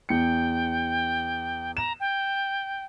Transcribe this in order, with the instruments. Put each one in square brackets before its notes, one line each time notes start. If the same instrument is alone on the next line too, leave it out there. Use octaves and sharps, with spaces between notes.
[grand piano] E2 C#7 [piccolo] G5
[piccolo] A#5 [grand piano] E7
[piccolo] G5